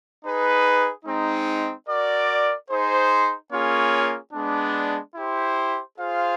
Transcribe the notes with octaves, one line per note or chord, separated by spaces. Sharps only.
D#4 G#4 B4
G#3 C4 D#4
F#4 A#4 D5
D#4 G#4 C5
A#3 C#4 F4 G#4 C#5
G#3 B3 D4
E4 G4 C5
F4 G#4 C5 F5